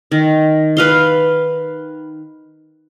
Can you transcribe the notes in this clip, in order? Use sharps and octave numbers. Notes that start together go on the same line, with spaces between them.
D#3
B4 F5 C6